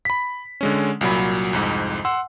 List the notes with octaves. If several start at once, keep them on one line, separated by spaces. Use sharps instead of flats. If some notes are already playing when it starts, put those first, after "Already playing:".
B5 B6
D3 G#3 C#4
C2 A#2 F#3 B5
C2 F2 G#2
F#5 C6 E6